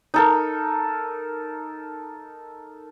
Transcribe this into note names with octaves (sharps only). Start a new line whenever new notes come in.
D#4 A4 A#4